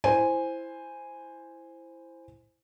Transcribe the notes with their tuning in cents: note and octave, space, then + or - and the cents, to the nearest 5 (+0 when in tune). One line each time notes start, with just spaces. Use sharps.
E4 +10 C5 +0 G#5 -5